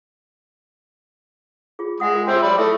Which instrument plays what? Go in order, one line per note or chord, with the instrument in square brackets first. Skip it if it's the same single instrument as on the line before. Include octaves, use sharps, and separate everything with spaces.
[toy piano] F4 G#4
[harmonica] G#3 [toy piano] E5 F#5 D#6
[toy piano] F4 A#4
[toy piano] F4 G#4 C5 [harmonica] E5 G5 C6
[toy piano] C#5 A5 [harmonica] D5 B5
[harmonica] A3 E4 [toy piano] A4 B4 E5